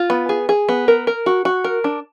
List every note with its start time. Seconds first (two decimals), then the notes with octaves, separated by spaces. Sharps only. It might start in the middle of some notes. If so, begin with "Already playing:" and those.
Already playing: F4
0.10 B3
0.29 G#4
0.49 G#4
0.69 B3
0.88 A#4
1.07 A#4
1.26 F#4
1.45 F#4
1.64 A#4
1.84 D4